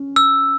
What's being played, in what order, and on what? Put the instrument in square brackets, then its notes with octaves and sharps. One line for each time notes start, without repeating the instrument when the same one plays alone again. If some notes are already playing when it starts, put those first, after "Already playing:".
Already playing: [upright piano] C#4
[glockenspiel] E6